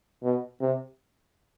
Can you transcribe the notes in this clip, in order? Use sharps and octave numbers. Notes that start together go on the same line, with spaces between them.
B2
C3